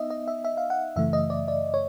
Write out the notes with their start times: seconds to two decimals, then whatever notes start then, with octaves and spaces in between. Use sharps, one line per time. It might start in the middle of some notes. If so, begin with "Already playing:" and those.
Already playing: B3 D#4 D#5 E5
0.10 D#5
0.28 E5
0.44 E5
0.57 F5
0.70 F#5
0.96 F#2 C#3 E3 A3 E5
1.13 D#5
1.30 D5
1.48 D5
1.74 C#5